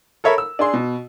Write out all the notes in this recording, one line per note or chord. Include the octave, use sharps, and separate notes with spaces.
A4 A#4 C#5 E5 B5
E6
D4 G#4 C6
B2